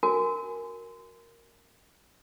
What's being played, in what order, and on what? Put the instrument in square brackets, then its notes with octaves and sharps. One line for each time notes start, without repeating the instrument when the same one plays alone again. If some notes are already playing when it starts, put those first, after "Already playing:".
[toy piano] F#4 A#4 G#5